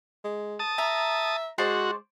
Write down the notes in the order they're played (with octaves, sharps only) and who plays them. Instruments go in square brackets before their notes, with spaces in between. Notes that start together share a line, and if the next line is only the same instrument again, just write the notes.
[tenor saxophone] G#3
[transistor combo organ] A5 D#6
[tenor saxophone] E5 [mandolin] A#5
[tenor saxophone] G#3 [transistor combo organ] F#4 [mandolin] C5 D5 C#6